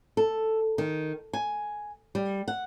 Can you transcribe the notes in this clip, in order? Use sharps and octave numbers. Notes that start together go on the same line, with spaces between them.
A4
D#3
G#5
G3
F#5